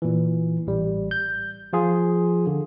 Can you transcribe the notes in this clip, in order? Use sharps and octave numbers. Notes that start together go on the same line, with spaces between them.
A#2 E3
A1 G3
G6
F3 F4 G#4
D3